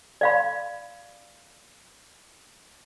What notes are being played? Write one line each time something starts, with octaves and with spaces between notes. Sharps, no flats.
D5 F5 B5